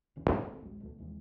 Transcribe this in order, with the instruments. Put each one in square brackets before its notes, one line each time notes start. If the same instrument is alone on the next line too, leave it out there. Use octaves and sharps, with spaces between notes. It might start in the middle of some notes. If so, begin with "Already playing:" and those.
[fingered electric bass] D1 C#3 E3
F#2 B2 E3
G#1 A3 C4
D1 A1 F#3 G#3
D#1 C#2 B2 A3
D#2 C3 E3 G#3